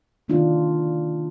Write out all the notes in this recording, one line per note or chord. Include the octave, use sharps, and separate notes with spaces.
C3 D#3 A#3 D4 D#4 F4